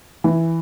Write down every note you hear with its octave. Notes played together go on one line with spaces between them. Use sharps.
E3